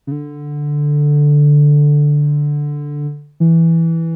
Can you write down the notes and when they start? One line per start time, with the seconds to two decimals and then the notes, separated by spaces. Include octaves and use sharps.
0.07 C#3
0.12 D3
3.40 E3